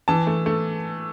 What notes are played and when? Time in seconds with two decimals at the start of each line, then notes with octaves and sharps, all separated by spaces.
0.08 E3 A5
0.27 A3
0.46 A3